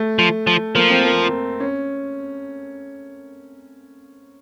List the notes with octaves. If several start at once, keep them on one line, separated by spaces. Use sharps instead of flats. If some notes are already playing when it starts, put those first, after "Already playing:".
Already playing: A3
F3
F3
F3 A#3
C4
A#3
C#4